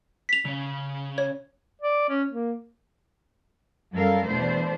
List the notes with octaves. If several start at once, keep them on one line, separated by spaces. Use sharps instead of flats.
B6 F7
C#3 C#4
C#5
D5
C#4
A#3
F#2 G3 A4 A#4 F5
E2 B2 A3 D4 C5